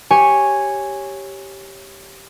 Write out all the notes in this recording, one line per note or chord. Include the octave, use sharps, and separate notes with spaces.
G4 C#5 G#5